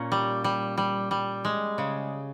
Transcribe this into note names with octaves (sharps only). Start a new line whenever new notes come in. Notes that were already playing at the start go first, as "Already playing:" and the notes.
Already playing: A#2 A#3 C#4
G3
G3
G3
G3
G#3
C#3